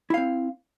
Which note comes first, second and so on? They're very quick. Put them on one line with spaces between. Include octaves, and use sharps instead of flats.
E4 F5 C4